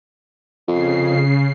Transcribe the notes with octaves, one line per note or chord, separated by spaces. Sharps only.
F2 C#3 C7